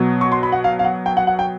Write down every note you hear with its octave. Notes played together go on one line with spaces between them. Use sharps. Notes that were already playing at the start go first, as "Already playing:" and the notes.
Already playing: B2 F#3 B3
C#6
C6
B5
F#5
F5
F5
F#5
G5
F#5
F#5
G5